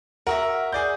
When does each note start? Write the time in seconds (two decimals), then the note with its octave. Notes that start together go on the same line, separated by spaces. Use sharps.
0.27 F#4 A#4 E5 A#5
0.73 G#4 D5 G6